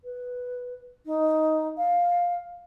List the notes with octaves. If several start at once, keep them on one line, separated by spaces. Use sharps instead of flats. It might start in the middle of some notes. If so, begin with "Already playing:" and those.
B4
D#4
F5